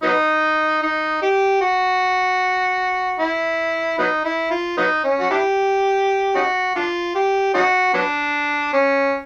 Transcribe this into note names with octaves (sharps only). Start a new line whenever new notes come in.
F#3 B3 D#4
D#4
G4
F#4
E4
F#3 B3 D#4
E4
F4
F#3 B3 D#4
C#4
F#4
D4 E4 G4
C#4 D#4 F#4
D4 F4
G4
C#4 D#4 F#4
F#3 B3 D4
C#4